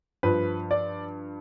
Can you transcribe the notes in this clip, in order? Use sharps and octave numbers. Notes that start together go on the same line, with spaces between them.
G2 F3 B4
D5